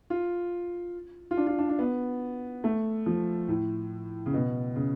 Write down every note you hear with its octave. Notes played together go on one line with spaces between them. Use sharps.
F4
F4
D4
F4
D4
D4
B3
A3
F3
A2
C#3
B2
C#3